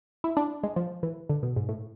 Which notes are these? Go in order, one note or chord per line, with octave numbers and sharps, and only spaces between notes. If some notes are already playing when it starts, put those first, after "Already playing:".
E4
D4
G#3
F3
E3
D3
B2
G#2
A2